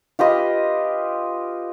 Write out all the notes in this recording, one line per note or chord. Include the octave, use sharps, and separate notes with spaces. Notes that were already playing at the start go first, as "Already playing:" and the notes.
F4 G4 B4 D#5